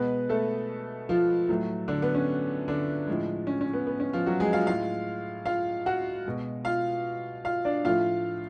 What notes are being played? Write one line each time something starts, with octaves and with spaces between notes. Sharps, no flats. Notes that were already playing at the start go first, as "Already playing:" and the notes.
Already playing: B2 G#3 B3 B4
A3 A4
F3 F4
A2 F#3 A3
D3 D4
B3
C#4
D3 D4
A2 F3 G#3
C#4
C#4
B3
B3
C#4
F3 F4
F#3 F#4
G#3 G#4
F4 F5
A2 G#3 F4 F5
F4 F5
F#4 F#5
B2 G#3
F4 F5
F4 F5
D4 D5
A2 F3 A3 F4 F5